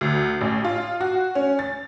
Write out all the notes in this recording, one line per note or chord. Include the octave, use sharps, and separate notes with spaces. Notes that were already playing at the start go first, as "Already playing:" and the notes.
D2
A1
F4
F#4
C#4
A6